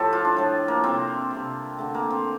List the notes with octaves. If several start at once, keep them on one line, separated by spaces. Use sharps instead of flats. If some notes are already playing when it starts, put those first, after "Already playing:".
Already playing: A2 F3 A3 G4 A4
F4
D4
A2 F3 A3
A#3
C3 G3 C4
C3 G3
D3 A3
A#3
C4